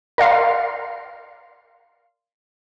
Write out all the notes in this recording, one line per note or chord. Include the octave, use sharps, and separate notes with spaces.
A#4 D5 F5 C6